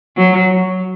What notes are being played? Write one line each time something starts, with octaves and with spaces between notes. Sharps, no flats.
F#3